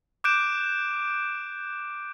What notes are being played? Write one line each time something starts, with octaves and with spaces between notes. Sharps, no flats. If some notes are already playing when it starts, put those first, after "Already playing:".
D6 F#6 G6 D7 E7